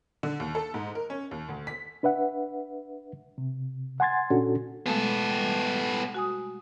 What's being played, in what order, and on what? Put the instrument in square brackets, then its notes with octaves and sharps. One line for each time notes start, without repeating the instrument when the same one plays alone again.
[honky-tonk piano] D3
D#2
A4
G#2
A#4
C#4
D#2
D2
B6
[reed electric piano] D4 B4 E5 F#5
C3
F#5 G#5 C6 G#6 A6
A#2 C#4 D4 F#4 A4
[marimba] B2 G#3 A3 [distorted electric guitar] B3 A4
[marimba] G3
F#4 G#5 D#6